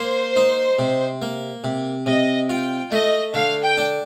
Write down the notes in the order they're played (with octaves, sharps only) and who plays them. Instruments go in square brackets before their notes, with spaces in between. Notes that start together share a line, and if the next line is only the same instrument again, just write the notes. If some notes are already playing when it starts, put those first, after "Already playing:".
Already playing: [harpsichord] A#3 [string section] C5
[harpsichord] D#4
C3
A#3
C3
[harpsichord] C3 [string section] D#5
[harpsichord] F4 [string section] G5
[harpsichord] A3 [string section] D#5
[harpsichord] D3 [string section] F5
[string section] G5
[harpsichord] D4